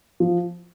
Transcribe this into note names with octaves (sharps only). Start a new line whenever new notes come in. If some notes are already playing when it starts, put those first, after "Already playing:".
F3